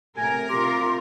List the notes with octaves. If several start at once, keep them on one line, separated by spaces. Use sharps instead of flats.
A2 C3 A#4 G#5
C3 F4 G4 C6